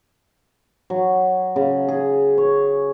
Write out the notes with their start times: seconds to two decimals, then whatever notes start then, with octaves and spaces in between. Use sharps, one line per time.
0.90 F#3
1.56 C#3
1.88 G#4
2.38 C#5